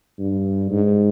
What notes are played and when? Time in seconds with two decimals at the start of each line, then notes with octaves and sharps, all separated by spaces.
0.19 G2
0.70 G#2